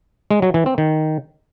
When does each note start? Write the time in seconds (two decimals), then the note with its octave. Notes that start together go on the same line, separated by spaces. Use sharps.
0.31 G#3
0.42 F#3
0.54 E3
0.66 C4
0.78 D#3